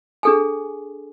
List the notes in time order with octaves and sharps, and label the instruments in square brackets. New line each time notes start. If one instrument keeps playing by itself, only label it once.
[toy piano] D4 G#4 A4 G5 G#5